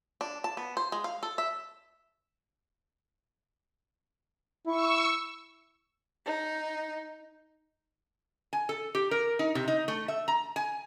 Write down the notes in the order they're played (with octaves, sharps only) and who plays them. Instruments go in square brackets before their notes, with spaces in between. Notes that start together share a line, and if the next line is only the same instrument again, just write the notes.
[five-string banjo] D4
A5
B3
C5
G#3
F5
A4
E5
[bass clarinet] E4 [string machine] C#6 E6
[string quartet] D#4
[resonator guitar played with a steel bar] G#5
A4
G4
A#4
D#4
C3
D#4
A3
E5
A#5
G#5